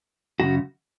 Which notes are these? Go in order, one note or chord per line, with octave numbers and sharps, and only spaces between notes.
F#2 C#3 F#4